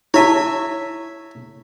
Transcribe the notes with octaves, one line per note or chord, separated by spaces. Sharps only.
E4 C#5 E5 A5